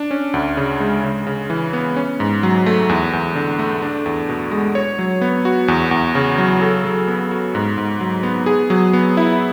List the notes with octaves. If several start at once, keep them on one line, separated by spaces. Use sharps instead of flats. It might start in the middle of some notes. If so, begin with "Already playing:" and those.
Already playing: D4
C#4
D2
C#3
G#3
C#3
C#3
E3
B3
C#4
G#2
F#3
A3
E2
E2
D3
A3
D4
E2
B2
G#3
C#5
F#3
B3
F#4
E2
E2
C#3
F#3
A4
F#3
B3
F#4
G#2
G#2
F#3
B3
G#4
F#3
B3
E4